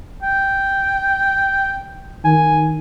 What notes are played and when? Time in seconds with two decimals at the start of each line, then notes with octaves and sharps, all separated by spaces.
0.23 G5
2.25 D#3 G#5